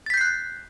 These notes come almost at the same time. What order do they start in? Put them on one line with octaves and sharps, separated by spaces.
A6 B6 G6 C7 F#6